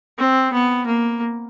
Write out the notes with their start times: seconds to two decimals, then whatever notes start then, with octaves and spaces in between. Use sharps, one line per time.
0.19 C4
0.53 B3
0.86 A#3